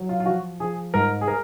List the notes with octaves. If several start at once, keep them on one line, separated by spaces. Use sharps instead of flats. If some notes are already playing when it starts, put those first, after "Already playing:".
Already playing: F#3
F4
F4
F3 F#4
F3 G#4
G#2 A#4
G#4
A#4